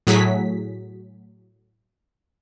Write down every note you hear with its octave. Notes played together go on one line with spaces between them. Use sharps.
A2 F#3 G#4 B6